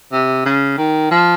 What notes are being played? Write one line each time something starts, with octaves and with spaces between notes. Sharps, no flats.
C3
C#3
D#3
F3